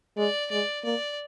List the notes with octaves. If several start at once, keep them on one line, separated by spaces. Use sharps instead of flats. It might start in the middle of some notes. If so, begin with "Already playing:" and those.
G#3 D5
G#3 D5
A#3 D5